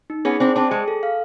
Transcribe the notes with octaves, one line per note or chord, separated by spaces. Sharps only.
D#4
B3 C#4 G#4
C4 D4 C5
C4 D4 A5
G#3 G#4
A4
F5